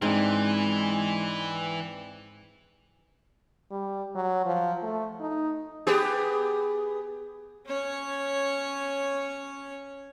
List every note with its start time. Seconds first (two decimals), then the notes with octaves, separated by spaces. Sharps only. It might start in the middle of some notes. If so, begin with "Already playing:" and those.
0.02 G#2 E3 G#3 C4 D4 G5
3.71 G3
4.15 F#3
4.45 F3
4.83 A3
5.20 D#4
5.87 B3 G4 G#4
7.67 C#4 C#5